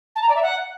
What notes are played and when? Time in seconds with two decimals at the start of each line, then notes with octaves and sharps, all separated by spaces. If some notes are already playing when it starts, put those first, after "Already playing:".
0.15 A5
0.22 A#5
0.29 D5
0.36 E5
0.42 F#5